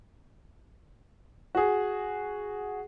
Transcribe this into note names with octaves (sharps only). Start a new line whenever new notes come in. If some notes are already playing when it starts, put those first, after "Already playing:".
F#4 G#4